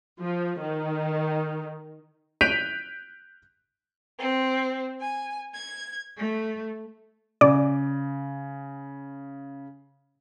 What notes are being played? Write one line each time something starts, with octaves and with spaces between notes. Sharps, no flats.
F3
D#3
F#6 G6 B6 D7 D#7 F7
C4
G#5
G#6
A3
C#3 D5